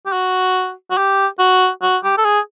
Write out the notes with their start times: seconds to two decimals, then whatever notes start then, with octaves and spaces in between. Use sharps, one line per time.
0.06 G4
0.13 F#4
0.91 F#4
0.97 G4
1.39 F#4
1.82 F#4
2.04 G4
2.18 A4
2.25 G#4